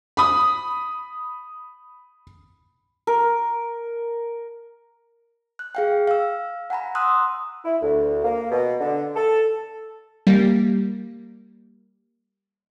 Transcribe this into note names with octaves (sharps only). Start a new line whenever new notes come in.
B5 D#6
A#4
F#6
G#4 F5 G5
F5 E6
F#5 G#5 A#5 B5
C6 D#6 E6 F#6
E4
D2
A#3
B2
D3
A4
G3 A#3